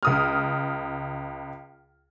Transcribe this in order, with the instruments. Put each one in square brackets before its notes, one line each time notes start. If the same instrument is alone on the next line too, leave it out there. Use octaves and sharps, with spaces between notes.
[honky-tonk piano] C#2 D#6 F6